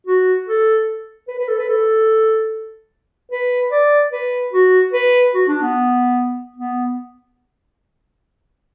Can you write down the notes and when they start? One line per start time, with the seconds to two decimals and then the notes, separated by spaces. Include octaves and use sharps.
0.07 F#4
0.48 A4
1.28 B4
1.38 B4
1.48 A4
1.58 B4
1.69 A4
3.32 B4
3.72 D5
4.13 B4
4.53 F#4
4.93 B4
5.35 F#4
5.48 D4
5.62 B3
6.56 B3